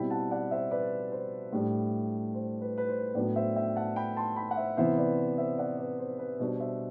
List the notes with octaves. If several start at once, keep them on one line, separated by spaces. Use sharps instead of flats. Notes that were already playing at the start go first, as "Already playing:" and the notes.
Already playing: B2 G3 C4 E4 G5 B5
F#5 A5
D5 F#5
C5 E5
B4 D5
C5
A2 G3 D4
C5
B4
B4
C5
A2 F#3 B3 D4 B4 D5
C5 E5
E5 G5
F#5 A5
G5 B5
A5 C6
G5 B5
F#5
C5 E5
C3 E3 B3 E4 C5 E5
B4 D5
C5 E5
D5 F#5
B4 D5
C5
B4
B2 G3 D4 C5
C5 E5